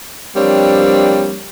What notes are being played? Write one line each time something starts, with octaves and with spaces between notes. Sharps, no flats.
F3 G3 A#3 C4 D4 C#5